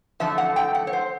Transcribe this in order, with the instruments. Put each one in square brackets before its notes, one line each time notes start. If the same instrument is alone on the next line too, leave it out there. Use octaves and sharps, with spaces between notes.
[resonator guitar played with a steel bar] F#2 D3 F3 A3 E5
F#5
G5
F#5
C#5
C5